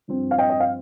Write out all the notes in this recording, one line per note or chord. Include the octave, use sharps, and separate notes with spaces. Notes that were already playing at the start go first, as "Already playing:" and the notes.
G2 F3 C4
F5
D#5 G5
D#5
F5